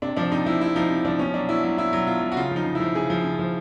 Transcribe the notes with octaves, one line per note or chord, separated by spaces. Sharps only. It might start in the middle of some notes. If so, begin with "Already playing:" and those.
C3 D4
F3 D4
C3 D#4
F3 E4
C3 E4
F3 D#4
C3
F3 D4
B2 C#4
F#3 D4
B2 E4
F#3 E4
B2 E4
F#3
B2 F4
F#3
F#4
C#3 F4
F3 D#4
C#3
E4
F3
C#3 G#4
F3
C#3
F3